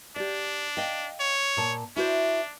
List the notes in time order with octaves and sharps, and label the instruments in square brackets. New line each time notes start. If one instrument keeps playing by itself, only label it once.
[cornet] D4 [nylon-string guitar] G4 D5
[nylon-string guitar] D#5 F5 G5
[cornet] C#5
[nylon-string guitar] A#2 A5
[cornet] D4 [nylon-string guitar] E4 F#4 C5